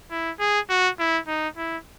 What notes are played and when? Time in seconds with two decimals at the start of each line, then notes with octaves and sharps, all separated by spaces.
0.11 E4
0.40 G#4
0.70 F#4
0.99 E4
1.28 D#4
1.57 E4